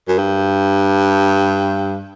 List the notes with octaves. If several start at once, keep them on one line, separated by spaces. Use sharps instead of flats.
F#2
G2